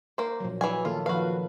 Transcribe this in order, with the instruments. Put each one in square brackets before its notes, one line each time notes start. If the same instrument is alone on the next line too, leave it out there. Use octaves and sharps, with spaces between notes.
[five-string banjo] A#3 C5
[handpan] A#2 F3 F#3
[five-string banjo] E3 G#4 G#5 [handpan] F#3
[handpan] D#3 A#3 A4 [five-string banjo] F4
[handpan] F3 B4 [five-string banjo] F#4 F5